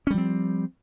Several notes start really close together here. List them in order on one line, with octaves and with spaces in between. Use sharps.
C#4 G3 F3 C4